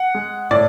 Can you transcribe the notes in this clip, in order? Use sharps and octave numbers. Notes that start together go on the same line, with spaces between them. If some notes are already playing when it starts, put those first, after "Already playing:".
Already playing: F#5
G#3
A2 D5